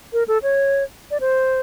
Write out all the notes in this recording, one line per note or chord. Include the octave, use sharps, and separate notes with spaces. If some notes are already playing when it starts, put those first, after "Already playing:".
A#4
A4
C#5
D5
C5